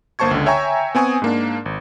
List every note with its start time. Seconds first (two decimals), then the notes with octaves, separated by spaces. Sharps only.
0.19 G1 A#3 C5 A5 C#6 G#6
0.31 C#2 D3
0.46 C#5 E5 G5 G#5 A#5 C#6
0.95 B3 C4 G#5 C#6 D#6
1.22 G#2 A#3 D4
1.66 G#1